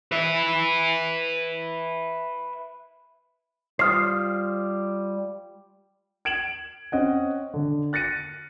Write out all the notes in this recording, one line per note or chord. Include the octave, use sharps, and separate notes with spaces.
B4 E5
G3 F4 C5 D#6 F6 C7
G#6 D7 E7 F#7
C4 C#4 D#5 F#5
D3
F#6 A6 A#6 C#7 D#7